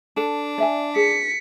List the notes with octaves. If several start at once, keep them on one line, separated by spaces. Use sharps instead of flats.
D4 A4
D5 E5 G#5
G#4 B6 C#7